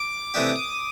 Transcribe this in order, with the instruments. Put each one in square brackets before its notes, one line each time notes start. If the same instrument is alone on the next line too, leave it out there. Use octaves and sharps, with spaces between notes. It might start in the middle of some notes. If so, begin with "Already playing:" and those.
Already playing: [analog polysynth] D6
[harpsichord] C3 E3 A3 D4 G4 [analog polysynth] D#6
[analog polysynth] D6